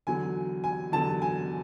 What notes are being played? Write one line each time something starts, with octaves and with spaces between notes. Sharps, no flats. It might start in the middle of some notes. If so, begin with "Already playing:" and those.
E2 D3 F#3 G#5
G#5
E2 D3 F#3 A5
G#5